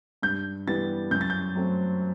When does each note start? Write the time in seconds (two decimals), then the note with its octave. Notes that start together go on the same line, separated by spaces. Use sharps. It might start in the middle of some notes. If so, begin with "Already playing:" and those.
0.22 G2 G6
0.67 E3 G3 B3 A6
1.11 F#2 G6
1.21 A6
1.30 G6
1.55 F#3 A3 C4